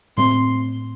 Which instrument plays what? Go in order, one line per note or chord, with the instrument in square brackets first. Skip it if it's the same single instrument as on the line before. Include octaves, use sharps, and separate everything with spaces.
[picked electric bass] A2 A3 C4 [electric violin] C6